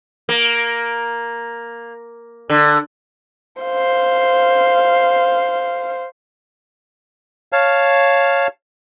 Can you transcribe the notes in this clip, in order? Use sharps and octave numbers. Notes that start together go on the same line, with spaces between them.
A#3
D3
C5 F5
C#5 F5 A5 F6